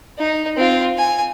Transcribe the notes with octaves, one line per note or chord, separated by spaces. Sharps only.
D#4
C4 F4
G#5